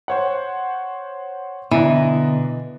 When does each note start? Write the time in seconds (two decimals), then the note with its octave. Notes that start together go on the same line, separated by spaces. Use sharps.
0.08 C5 C#5 F#5
1.71 B2 D3 E3 B3 D4 D#5 A#5